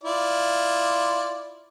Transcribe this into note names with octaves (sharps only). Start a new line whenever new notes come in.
E4 F4 D5